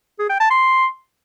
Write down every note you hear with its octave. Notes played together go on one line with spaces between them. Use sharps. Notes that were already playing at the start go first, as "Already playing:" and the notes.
G#4
G5
A5
C6